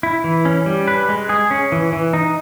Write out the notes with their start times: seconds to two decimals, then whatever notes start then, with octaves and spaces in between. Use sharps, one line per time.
0.03 E4
0.24 E3
0.45 C#4
0.66 G3
0.88 B4
1.09 G#3
1.29 G#4
1.51 C#4
1.72 E3
1.93 E3
2.13 D#4